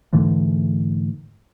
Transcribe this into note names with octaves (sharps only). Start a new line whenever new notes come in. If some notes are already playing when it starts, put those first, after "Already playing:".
G#2 D3 E3 A3